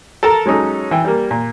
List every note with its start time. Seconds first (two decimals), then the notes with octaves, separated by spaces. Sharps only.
0.23 A4 A#4 A5 A#5
0.46 F#3 G#3 C#4 D#4 A4
0.91 E3 G5
1.04 G3 A#3
1.31 A#2